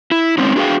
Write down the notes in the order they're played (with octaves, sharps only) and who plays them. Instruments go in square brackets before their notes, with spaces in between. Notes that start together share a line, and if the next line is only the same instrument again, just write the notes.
[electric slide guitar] E4
G#3 C4 C#4 D#4
D4 F#4 G#4 C#5 F5 G5